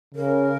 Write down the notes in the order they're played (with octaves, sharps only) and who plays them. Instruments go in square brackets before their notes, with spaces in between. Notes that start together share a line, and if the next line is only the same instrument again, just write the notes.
[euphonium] C#3 [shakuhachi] A#4